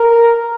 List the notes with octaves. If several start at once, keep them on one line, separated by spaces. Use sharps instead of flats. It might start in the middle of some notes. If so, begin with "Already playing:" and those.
Already playing: A#4